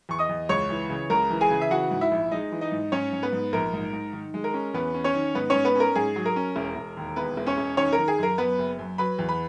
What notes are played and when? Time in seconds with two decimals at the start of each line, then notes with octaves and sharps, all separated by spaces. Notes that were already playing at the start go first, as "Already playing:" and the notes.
0.09 E2 C#6
0.19 D#5 D#6
0.29 E2
0.49 C#2 C#5 C#6
0.70 E3
0.90 C#3
1.10 C#2 A#4 A#5
1.30 E3
1.41 G#4 G#5
1.50 C#3
1.61 E5
1.71 E3 F#4 F#5
1.91 G#2
2.01 E4 E5
2.11 A#1
2.31 G#3 D#4 D#5
2.52 E3
2.61 D#4 D#5
2.72 G#2
2.92 G#2 C#4 C#5
3.13 G#2
3.23 B3 B4
3.32 G#2
3.53 A#1 A#4
3.73 G#2
3.93 G#2
4.13 D#3
4.34 G#3
4.44 A#4
4.54 C#4
4.74 E2 B3 B4
4.94 C#4
5.04 C#4 C#5
5.14 D#3
5.35 G#2 B3 B4
5.50 G#2 C#4 C#5
5.65 B3 B4
5.75 C#4 A#4
5.95 G#2 G#4
6.16 F#3
6.26 A#4
6.36 C#4
6.56 E1
6.76 E1
6.97 D#2
7.16 E1 B3 B4
7.37 E1
7.46 C#4 C#5
7.57 E1
7.77 D#3 C#4 C#5
7.93 A#4
7.98 D#3
8.08 G#4
8.18 F#2 A#4
8.38 F#2 B3 B4
8.59 F#1
8.79 F#2
8.98 F#3 B4 B5
9.19 E2
9.29 B4 B5